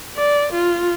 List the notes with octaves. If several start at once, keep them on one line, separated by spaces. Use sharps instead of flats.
D5
F4